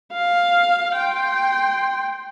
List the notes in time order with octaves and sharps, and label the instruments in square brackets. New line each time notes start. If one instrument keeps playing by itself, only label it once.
[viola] F5
G5 C6